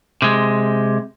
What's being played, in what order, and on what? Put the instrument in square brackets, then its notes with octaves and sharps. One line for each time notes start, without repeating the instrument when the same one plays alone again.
[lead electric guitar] C3 G#3